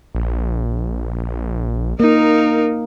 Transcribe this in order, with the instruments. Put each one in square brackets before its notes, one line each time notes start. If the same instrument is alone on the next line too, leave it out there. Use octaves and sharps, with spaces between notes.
[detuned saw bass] A#1
[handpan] A#3 [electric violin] D#4 A#4